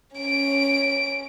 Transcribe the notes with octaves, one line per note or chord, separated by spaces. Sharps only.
C#4 D7